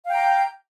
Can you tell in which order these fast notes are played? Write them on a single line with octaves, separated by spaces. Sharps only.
F5 G5 A#5